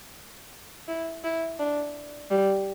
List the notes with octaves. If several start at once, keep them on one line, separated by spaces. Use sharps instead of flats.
E4
E4
D4
G3